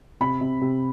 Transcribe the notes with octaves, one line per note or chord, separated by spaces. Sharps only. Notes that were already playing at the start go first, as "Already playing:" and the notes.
C3 B5
C3
C3